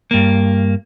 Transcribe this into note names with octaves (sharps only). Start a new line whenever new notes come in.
G2 A#3